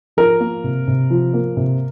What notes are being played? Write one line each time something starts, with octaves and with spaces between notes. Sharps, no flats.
F3 A#4
A#3
C3
C3
F3
A#3
C3